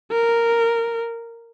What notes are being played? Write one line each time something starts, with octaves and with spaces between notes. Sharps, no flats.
A#4